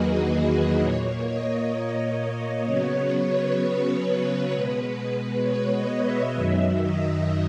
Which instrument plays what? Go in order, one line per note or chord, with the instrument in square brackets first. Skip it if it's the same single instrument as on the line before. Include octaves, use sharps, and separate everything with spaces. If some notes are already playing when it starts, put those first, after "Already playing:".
Already playing: [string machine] E2 D#3 F#3 A#3 F#4 G#4 B4 D#5
G#4
B4
A#2 A#3 C#5
D#5
C#3 F#3 B3 C#5
C#5
B4
B2 G#3 B3
C#5
D#5
E5
F#2 D#3 F#3 E5
D#5